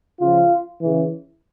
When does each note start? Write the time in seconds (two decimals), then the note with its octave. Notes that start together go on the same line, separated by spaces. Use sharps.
0.20 C#3 F3 F4
0.82 C#3 E3